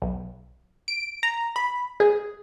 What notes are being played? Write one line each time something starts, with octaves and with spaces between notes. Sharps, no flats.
B1
D7
A#5
B5
G#4